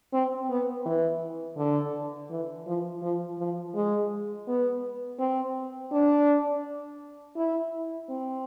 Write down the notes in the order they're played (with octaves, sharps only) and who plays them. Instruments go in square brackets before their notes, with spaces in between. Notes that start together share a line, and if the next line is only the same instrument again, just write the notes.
[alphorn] C4
B3
E3
D3
E3
F3
F3
F3
G#3
B3
C4
D4
E4
C4